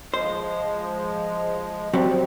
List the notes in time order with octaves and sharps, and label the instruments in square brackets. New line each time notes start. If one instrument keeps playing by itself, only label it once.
[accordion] F3 G#3 [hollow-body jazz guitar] C5
[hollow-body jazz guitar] F#3 G3 [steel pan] C4